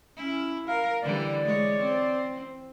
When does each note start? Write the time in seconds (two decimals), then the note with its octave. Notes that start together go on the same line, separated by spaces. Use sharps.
0.17 C#4 E4
0.68 A#4 F5
1.02 D3 E3 G3 D5
1.44 G#3 C#5
1.80 C4